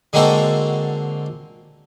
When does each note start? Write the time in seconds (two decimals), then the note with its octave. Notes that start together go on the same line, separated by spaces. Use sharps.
0.13 D3 G#3 A#3 C4 F#4 A4